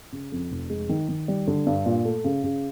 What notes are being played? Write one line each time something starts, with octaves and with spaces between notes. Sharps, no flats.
C#3
F2
F1
G#3
D#3
D#3
G3
D3
G2
A#2
A3
C#3
C#3